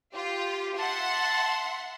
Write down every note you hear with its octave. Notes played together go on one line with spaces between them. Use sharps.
F4 G4
E5 F#5 A5 C6